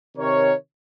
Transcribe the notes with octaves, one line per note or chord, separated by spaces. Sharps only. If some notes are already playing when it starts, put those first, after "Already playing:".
C3 D#3 A#4 C#5